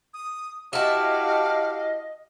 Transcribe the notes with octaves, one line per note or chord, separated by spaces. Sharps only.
D#6
E4 F#4 G4 D#5 F5 A5